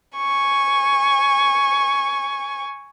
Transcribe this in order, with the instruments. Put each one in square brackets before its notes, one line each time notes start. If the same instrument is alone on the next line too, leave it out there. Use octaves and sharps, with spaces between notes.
[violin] G#5 C#6